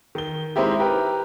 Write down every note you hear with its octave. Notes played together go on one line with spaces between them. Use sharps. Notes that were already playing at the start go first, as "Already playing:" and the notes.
D#3 G7
G#3 C4 D#4 E4 G4
G4 A#4 B4 G5